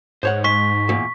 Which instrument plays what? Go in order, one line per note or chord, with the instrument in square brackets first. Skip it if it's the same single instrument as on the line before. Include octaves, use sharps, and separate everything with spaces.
[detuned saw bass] G#2 [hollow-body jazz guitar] C5 C#5 F#5
[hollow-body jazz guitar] G#3 [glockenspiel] C#6 B6
[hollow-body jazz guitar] E2 A#2